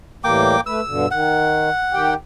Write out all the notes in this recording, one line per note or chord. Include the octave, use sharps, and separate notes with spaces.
A2 E3 G3 A#3 G5 D6
A3 B4 E6
G2 B2 D3
D#3 F#5
D#3 G4 G5